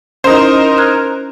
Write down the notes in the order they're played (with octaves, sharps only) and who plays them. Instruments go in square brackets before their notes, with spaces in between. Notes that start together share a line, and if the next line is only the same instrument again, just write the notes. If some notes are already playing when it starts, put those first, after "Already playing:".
[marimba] C#4 E4 [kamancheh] D#4 A#4 [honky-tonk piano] C5 D#5
[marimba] F6 F#6 G#6